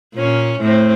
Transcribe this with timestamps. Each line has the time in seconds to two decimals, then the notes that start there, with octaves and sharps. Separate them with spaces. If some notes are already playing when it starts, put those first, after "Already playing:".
0.15 A#2 C#4
0.60 A2 C4